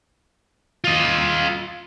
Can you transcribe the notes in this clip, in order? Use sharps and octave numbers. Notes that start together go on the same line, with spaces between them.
F4 D#5